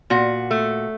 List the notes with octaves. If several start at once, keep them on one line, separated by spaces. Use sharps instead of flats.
A#2 F#4
A3